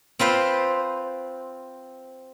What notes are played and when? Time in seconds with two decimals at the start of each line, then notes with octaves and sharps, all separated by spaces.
0.19 C4 F4 B4 C5